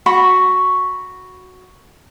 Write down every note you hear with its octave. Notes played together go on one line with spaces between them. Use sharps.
F#4 B5 C#6